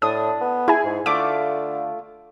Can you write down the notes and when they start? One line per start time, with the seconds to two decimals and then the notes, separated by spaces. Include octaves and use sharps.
0.02 A2 D4 D#6
0.41 B3
0.68 E4 G#4 G#5
0.84 G#2
1.06 D3 A3 F4 D6